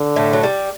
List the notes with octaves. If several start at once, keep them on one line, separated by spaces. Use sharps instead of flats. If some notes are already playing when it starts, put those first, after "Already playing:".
Already playing: D3
A2 A3
F#3
G3